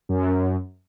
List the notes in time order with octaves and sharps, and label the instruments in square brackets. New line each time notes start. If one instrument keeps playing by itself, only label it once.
[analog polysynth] F#2